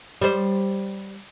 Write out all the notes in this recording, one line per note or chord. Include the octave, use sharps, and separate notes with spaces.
G3 C5